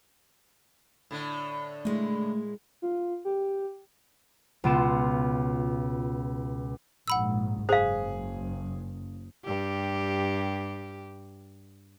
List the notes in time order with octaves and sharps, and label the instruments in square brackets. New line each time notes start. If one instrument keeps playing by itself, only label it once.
[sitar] A2 D3
[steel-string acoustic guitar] A#2 G#3 E4 [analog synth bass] A3
[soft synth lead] F4
G4
[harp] C#2 B2 B3 F4 D7 E7
[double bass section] A#1 G#2 [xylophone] F#5 B5 E6
[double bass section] F#1 [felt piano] G#4 [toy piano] C5 F5
[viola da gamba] G2 G4